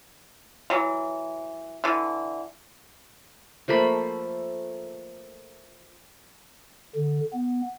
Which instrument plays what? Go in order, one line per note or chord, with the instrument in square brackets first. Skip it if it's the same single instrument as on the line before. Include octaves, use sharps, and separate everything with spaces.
[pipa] E3 F#3
D3 E3
[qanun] F3 A3 A#3 B5
[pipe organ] D3
B3